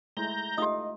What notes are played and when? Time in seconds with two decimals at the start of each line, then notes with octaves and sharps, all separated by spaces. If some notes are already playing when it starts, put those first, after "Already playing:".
0.17 G#3 A3 E4 A#5 G6
0.58 A3 D#4 F4 G4 D#5 D#6